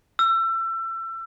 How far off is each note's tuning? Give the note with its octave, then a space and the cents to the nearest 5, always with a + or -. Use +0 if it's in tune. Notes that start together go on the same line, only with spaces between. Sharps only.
E6 +30